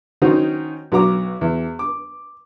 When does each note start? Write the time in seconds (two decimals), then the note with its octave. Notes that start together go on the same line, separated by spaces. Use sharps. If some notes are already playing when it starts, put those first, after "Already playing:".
0.22 D#3 C#4 D#4 F#4 C5
0.92 B1 F#4 A#5 D6
1.41 E2
1.79 D6